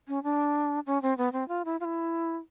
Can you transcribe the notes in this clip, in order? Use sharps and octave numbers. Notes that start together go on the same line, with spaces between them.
C#4
D4
C#4
C4
B3
C4
F4
E4
F4
E4